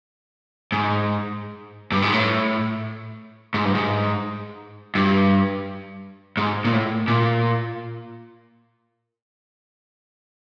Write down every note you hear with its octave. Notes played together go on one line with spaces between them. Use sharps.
G#2
G2
G#2
A2
G#2
G2
G#2
G2
G#2
A#2
A2
A#2